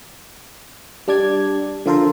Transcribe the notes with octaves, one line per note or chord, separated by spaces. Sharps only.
G3 D4 D5 G#6
D3 F3 F4 A4 A#4 C5